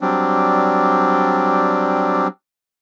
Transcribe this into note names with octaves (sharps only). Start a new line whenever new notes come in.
F#3 G3 C4 D4